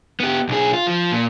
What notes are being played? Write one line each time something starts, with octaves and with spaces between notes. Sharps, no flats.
B3 G4
B1 G#4
F4
F3
A#2